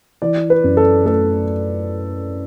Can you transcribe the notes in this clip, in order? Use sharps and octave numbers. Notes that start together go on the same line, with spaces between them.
E3 D5
B4
F#2
A4
A3 A4